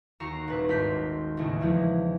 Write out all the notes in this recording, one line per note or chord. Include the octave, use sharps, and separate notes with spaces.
D#2 F#4 A#5 C#6 C7 E7
D#1 C2 B4
G#1 G#2 A#4 C6 G6 B6
A1 D#2 C#3
E2 E3 F3 G#3